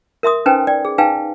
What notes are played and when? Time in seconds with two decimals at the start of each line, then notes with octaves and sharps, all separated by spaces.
0.23 A#4 E5 C6 D#6
0.46 C#4 D#4 B4 C5 G5 G#5
0.67 D5 G5
0.85 G#4
0.98 D#4 B4 F5 G5 G#5